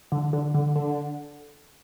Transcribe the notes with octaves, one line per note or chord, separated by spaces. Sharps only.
D3
D3
D3
D3